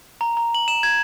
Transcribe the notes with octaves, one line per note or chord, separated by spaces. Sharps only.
A#5
A#5
F#7
E7
G#6